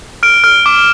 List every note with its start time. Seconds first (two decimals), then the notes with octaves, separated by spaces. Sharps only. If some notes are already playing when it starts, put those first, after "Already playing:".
0.23 F6 D7
0.44 F6
0.66 D6